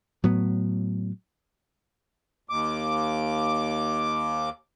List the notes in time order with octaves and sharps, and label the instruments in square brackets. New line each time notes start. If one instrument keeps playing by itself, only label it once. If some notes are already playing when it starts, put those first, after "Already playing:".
[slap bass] A2 F#3 B3
[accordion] D#2 D6